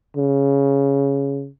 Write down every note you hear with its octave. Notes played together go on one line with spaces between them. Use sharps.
C#3